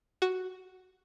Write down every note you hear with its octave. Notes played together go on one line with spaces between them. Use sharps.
F#4